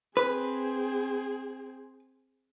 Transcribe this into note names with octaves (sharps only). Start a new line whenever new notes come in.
C4 G#4 B4